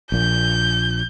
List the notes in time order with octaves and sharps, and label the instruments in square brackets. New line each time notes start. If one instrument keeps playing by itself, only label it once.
[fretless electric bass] A#1 A#2 [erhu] G6